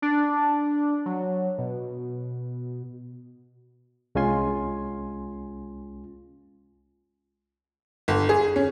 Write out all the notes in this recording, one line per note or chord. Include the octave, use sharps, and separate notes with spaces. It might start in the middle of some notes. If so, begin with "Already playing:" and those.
D4
F#3
B2
C2 G#3 C#4 F4 G#5 C6
G1
G#4
C#4